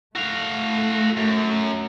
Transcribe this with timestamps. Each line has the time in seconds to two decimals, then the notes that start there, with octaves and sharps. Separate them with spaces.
0.16 A3 F#4 F5
1.17 F#2